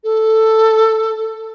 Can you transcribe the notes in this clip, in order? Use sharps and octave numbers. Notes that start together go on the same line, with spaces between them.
A4